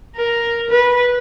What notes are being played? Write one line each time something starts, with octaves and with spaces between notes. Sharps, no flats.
A#4
B4